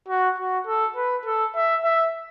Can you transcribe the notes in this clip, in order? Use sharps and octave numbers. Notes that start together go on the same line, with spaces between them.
F#4
F#4
A4
B4
A4
E5
E5